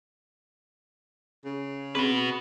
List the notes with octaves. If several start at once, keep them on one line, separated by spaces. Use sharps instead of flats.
C#3
C4 F#4 G#4 B4